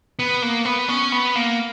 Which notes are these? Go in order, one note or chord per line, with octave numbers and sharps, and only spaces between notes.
B3
A#3
B3
C#4
B3
A#3